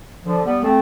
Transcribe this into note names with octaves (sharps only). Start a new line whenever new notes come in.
D3 F3
G3 B3
A3 C4